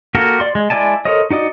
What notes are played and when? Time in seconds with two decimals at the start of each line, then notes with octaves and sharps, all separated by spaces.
0.15 A#3 F#4 G4 A4 A#4
0.40 D5 C6
0.55 G#3
0.70 G#3 E4 D5 G#5 A5
1.05 A4 A#4 C5 C#5 D#5
1.31 D#4 F#4 D5 D#5